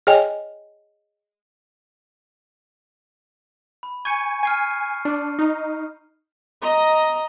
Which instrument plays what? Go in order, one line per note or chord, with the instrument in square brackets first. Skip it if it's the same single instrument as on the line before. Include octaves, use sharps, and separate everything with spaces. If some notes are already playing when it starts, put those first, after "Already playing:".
[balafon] G#4 C#5 D#5 G5 G#5
[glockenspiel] B5
[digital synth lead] G#5 [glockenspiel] C#6 G6 C#7
[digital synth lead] G#5 [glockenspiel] F6 C7 D#7
[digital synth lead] D4
D#4
[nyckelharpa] D#5 A#5